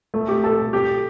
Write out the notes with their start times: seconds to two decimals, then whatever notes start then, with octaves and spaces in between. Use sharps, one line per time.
0.14 A3
0.28 G4
0.44 A4
0.73 G4